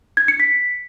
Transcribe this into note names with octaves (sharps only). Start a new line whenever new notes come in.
G#6
C#7
B6